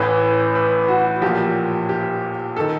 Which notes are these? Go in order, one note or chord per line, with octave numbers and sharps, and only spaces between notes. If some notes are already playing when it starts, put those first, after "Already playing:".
Already playing: A1 A2 E3 B4
B4
F#4
A#1 A#2 G4
G4
D#3 A4